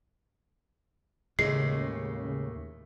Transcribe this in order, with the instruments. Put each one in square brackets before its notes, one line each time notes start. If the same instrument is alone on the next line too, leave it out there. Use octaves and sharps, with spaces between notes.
[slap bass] D#2 A2 [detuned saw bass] C#3 [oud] G#3 [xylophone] C7